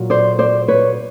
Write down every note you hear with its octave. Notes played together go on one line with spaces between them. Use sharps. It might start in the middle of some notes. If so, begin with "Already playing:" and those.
Already playing: A#2 F#3
C5 D5
C5 D5
B4 C#5